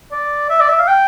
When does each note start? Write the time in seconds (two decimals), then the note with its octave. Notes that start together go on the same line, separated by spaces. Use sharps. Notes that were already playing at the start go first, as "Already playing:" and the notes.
0.12 D5
0.50 E5
0.60 D5
0.69 E5
0.79 F5
0.88 G5